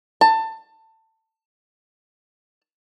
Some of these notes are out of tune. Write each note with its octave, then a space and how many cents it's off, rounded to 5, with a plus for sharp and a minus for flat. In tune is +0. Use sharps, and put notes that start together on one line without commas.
A5 +20